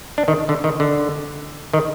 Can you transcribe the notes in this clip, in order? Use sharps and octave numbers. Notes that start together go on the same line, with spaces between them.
D4
D#3
D3
D#3
D3
D#3